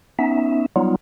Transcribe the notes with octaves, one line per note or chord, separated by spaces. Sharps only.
B3 C#4 D#4 E5
F#3 G3 B3 D#4 F4